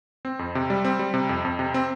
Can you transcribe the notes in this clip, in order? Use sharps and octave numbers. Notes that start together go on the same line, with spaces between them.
C4
F2
C3
G3
C4
G3
C3
F2
F2
C3
C4